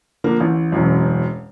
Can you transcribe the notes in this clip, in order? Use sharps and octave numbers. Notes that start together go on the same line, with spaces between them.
D3 F3 A#3 D4
A1
E1 A1 F#2